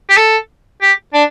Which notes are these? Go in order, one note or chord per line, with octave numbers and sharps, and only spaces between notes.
G4
A4
G4
D4